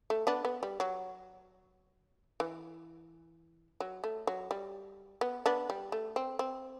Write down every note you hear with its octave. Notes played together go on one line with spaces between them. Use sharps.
A3
B3 D4
B3
G3
F#3
E3
F#3
A3
F#3
G3
B3
B3 D4
G3
A3
C4
C4